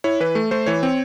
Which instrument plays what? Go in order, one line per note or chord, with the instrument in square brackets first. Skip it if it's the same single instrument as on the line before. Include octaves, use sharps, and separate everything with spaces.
[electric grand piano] E4 C#5
E3 B4
A3
A3 C5
E3 C#5
C4